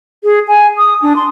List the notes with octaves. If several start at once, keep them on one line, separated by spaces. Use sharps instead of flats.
G#4
G#5
D#6
D4
C6